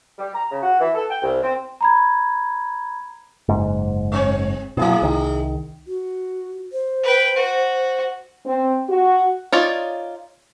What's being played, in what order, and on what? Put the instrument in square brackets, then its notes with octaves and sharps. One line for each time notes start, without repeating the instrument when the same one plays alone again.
[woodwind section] G3
A#5
C#3
F#4
E3
A4
G5
C2
C4
[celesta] A#5 B5 G#6
[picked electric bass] F#1 G#2
[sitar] G#3 C4 C#5
[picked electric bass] B2 F#3 [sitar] A3 E4 G#4
[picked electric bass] C2 D#3
[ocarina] F#4
C5
[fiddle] B4 G5
F#4
[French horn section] C4
F#4
[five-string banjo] D#4 F4 C#5 D5